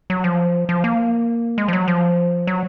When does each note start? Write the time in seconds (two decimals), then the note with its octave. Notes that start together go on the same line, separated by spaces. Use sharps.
0.10 F#3
0.24 F3
0.69 F3
0.84 A#3
1.58 G#3
1.68 F3
1.73 F#3
1.88 F3
2.47 F#3